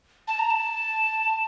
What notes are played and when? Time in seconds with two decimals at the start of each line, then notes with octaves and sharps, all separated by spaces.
0.28 A5
0.39 A#5
0.50 A5